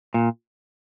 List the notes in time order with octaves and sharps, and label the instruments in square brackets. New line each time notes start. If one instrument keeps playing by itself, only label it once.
[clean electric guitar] A#2